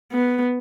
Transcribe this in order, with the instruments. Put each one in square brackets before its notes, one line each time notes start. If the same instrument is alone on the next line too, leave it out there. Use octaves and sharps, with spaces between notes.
[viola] B3